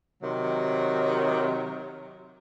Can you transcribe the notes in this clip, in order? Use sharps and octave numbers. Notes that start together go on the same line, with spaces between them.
C3 D#3 F#3